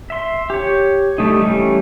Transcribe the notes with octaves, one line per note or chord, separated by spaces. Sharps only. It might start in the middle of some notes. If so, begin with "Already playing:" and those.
E5 C6
G4 C#5
G3 A3 D#4
E3 G3 A3 C#4